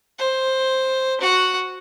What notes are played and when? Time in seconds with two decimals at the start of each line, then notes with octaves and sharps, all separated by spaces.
0.18 C5
1.21 F#4 F#5